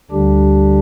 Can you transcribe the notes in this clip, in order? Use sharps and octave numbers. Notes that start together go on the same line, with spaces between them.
D2 D3 G3 D4 G4